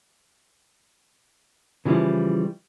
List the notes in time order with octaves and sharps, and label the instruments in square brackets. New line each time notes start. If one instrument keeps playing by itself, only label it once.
[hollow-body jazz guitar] C#3 E3 F3 G3 E4